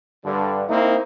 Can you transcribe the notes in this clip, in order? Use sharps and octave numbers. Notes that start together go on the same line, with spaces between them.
G2 D3
A#3 C4 D#4 E4